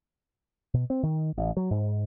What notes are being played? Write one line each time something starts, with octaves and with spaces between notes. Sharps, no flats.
B2
C4
D#3
A1
F#3
G#2